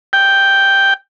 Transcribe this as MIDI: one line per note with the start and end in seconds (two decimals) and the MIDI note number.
0.13 0.94 79